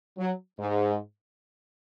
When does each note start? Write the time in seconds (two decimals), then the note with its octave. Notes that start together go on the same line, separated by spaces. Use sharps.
0.18 F#3
0.59 G#2